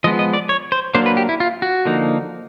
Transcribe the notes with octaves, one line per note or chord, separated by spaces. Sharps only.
F3 G#3 B3 D#5
D#5
D5
C#5
C5
F#3 A#3 D4 C5
B4
G4
E4
F4
F#4
D3 F3 A#3 D#4